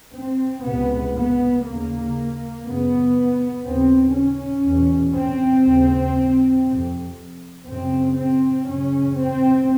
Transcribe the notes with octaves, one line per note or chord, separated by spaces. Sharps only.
C4
C#2 C3 B3
B3
D#2 C#3 A#3
F#2 C#3 B3
D#2 C#3 C4
C#4
E2 B2
C4
D#2 C#3
F2 C3
F#2 C#3 C4
C4
F#2 C#3 C#4
C4